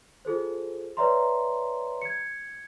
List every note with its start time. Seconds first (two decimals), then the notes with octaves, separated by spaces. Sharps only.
0.25 F4 G#4 A4 C5
0.97 B4 C#5 D5 E5 A#5 C6
2.02 G#6 C#7